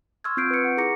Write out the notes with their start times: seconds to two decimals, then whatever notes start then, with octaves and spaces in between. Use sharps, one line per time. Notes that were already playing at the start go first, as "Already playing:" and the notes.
0.24 C6 C#6 E6 F6 G#6
0.37 C4 F4 G6 C7 D7
0.51 B4 C#7
0.64 F#5 C#6
0.77 E4 G#4 A#5 D6 A#6 C#7